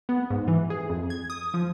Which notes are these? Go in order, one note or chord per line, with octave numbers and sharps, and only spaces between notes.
B3
G#2
E3
G#4
F2
G#6
D#6
F3